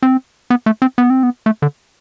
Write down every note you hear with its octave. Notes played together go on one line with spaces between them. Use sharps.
C4
B3
A3
C4
B3
C4
B3
A3
D3